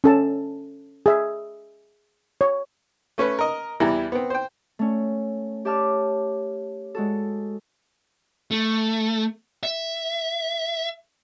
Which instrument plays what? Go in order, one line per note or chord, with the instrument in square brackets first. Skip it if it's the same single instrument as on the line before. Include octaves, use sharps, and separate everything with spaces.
[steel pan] C#4 A4 A5
G#4 E5
C#5
[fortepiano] A3 C#4 B4
A#4 D#5
E2 E3 G3 E4 G#5 A#5
B3 C4
C5 G5
[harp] A3 C#4
G4 C#5 E5 A5 D6 F6
G#3 F#4 A4
[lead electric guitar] A3
E5